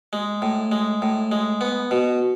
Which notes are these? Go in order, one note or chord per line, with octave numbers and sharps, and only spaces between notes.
G#3
A2
G#3
A2
G#3
B3
B2